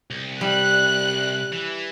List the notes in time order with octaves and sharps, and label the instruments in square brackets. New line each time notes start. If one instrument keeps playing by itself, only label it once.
[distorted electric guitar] C2
[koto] G3 [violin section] F#6
[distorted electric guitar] E3